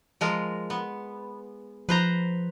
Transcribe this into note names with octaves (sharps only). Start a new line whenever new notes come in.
F3 G#3 A#4
B3
F3 B4 C5 A#5